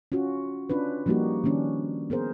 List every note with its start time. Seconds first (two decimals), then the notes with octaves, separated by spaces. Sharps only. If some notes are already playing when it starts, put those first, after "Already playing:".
0.12 C#4 F4 F#4
0.69 C#4 D4 F4 B4
1.06 F3 G3 A#3 D#4 F#4 G4
1.44 D#3 A#3 C#4 D4
2.10 B3 G#4 A#4 C5